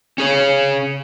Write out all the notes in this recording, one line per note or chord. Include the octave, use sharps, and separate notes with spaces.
C#4 G#4 C#5